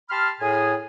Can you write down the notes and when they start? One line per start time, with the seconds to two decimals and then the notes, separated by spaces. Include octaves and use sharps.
0.09 G4 A5 B5 C6 F6
0.41 A2 G#4 G#5